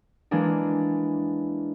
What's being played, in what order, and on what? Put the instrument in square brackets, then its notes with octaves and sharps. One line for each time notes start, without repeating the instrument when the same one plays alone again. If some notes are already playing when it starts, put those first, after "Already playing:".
[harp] E3 G#3 A#3 D4